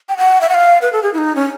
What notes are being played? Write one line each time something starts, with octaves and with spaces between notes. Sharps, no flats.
G5
F#5
E5
F#5
F5
B4
A4
G#4
E4
D#4
C#4